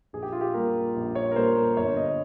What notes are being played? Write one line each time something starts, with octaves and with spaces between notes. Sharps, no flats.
A#1 G#4
G4
F4
G4
A#2 G3 A#3 A#4
A#1
C#5
A#4
A#2 G3 A#3 C5
A#4
G1 C#5
D#5